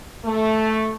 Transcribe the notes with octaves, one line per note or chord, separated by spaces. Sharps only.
A3